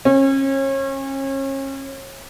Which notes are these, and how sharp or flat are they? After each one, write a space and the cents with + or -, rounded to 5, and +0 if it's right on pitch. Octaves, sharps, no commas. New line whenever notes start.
C#4 -35